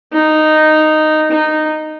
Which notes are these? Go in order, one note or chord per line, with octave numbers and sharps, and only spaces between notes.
D#4
D#4